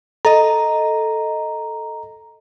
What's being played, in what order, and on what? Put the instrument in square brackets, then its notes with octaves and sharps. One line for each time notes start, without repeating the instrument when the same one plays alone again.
[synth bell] A4 D#5 [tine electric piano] A#5